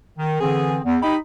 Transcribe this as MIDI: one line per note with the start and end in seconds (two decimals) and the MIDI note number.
0.18 0.39 51
0.40 0.79 50
0.40 0.79 52
0.40 0.79 60
0.40 0.79 68
0.85 0.96 40
1.02 1.16 63
1.02 1.16 67
1.02 1.16 75
1.02 1.16 83